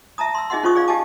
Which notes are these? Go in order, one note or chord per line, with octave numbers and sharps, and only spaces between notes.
E5 A5 A#5 D#6
C6 E6
D#4 G#4 D#5 E5 F#5 C6
C#4 F4 C5 C#6 D#6
G#4 D5 F5
G4 D#5 F5 G#5 A5 D6